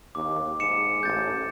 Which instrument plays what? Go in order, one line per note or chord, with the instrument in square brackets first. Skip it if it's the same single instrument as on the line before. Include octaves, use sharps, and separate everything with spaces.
[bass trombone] D#2 [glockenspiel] D6
[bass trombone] G#2 [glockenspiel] D6 C#7 E7
[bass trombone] A1 [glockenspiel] G6 A6